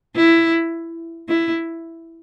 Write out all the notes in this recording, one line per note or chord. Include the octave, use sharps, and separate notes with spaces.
E4
E4